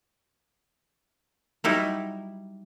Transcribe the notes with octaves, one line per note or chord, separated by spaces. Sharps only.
F#3 G3 D#4 E4